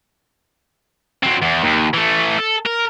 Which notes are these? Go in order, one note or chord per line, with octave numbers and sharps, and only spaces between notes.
F#3 C4
E2
D#2
E3 A3
A4
A#4